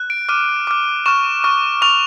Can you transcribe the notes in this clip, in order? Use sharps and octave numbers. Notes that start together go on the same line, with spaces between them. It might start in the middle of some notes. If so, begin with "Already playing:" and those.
Already playing: F#6
D7
D6 F6 D#7
D6 F6
C#6 F6 E7
C#6 F6
C#6 F6 F7